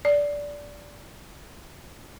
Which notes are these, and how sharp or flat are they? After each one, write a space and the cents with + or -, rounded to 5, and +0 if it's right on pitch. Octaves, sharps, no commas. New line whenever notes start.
D5 -15